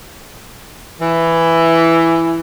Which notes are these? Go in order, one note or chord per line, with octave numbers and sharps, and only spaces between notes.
E3